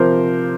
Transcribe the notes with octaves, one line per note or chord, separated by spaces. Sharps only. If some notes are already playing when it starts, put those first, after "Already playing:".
Already playing: C3 F3 A#4 C5